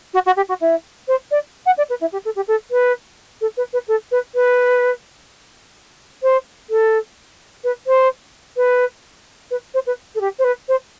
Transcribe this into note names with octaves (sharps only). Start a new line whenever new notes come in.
F#4
F#4
G4
F#4
E4
C5
D5
F#5
D5
B4
E4
G4
A4
G4
A4
B4
A4
B4
B4
A4
B4
B4
C5
A4
B4
C5
B4
B4
C5
B4
A4
G4
C5
B4
C5